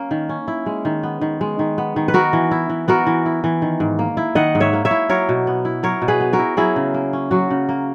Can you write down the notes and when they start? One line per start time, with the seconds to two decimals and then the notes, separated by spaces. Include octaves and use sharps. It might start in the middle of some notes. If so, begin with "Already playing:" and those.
Already playing: A#3 C#4
0.11 D#3
0.29 C#4
0.48 E4
0.66 G#3
0.85 D#3
1.03 B3
1.21 D#3
1.41 G#3
1.59 D#3
1.78 B3
1.96 D#3
2.08 B4
2.14 B3 F#4 A#4
2.33 E3
2.51 E4
2.69 E3
2.88 B3 F#4 A#4
3.07 E3
3.26 E4
3.44 E3
3.62 D#3
3.80 G#2
3.99 A#3
4.17 E4
4.35 D#3 D#5 F#5
4.55 G#2
4.60 C#5 E5
4.73 A#3
4.85 C#5 E5
4.91 E4
5.09 F#3 A#4 C#5
5.29 B2
5.47 B3
5.65 E4
5.83 F#3 A#4 C#5
6.02 B2
6.08 G#4 B4
6.21 B3
6.33 F#4 A#4
6.39 E4
6.57 F#3 E4 G#4
6.76 C#3
6.94 A#3
7.13 C#4
7.31 F#3 F#4
7.50 C#3
7.69 A#3